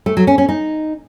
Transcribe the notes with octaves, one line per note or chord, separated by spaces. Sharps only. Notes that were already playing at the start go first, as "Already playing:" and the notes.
A3
F#3
C#4
C#4
D#4